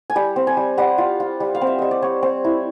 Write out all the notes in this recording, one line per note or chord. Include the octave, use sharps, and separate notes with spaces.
G#5
G3 G5
C4
G#5
G3
G3 F#5
F4
F4
G3
F5
C4
E5
G3 D#5
D5
C4 C#5
C4
E4